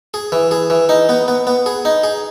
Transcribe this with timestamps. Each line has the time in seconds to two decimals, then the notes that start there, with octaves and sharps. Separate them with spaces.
0.14 G#4
0.32 E3
0.51 G#4
0.70 E3
0.89 D#4
1.09 B3
1.28 B3
1.47 B3
1.66 G#4
1.85 D#4
2.04 G#4